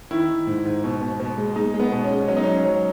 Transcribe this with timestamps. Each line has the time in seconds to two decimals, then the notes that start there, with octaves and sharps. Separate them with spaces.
0.11 D#3 E4
0.29 D#3
0.47 G#2
0.65 G#2
0.84 B2
1.01 B2
1.20 B2
1.38 G#3
1.56 G#3 D#4
1.74 G#3
1.80 B3
1.92 B2
2.04 C#4
2.11 G#3
2.28 F#3 C#4
2.37 D#4
2.44 F#3 C#4
2.65 F#3